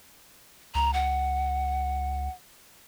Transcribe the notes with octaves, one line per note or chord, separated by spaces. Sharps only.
C#2 A#5
F#5